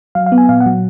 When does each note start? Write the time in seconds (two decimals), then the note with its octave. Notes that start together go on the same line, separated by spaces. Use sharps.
0.15 F#3 F5
0.26 F5
0.32 B3
0.38 G#5
0.49 A#2 F5
0.60 F#5
0.66 F#3